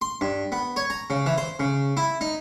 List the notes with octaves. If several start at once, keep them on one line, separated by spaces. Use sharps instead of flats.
C6
G2
B3
C#5
A#5
C#3
E3
C5
C#3
E4
D#4